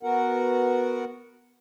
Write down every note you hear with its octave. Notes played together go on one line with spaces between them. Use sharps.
B3 F#4 A#4 F#5